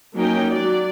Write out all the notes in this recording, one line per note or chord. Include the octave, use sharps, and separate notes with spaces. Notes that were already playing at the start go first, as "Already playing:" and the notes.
F#3 A#3 C#4 D#4 A#4 G5
F#3 D5